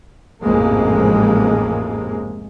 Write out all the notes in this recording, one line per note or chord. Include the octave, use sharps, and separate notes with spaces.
A1 F2 G#2 C3 G#3 A#3